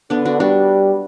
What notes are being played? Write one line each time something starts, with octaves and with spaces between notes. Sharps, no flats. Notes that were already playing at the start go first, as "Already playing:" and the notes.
D3 B3 D4
D4 F#4
G3 D4 F#4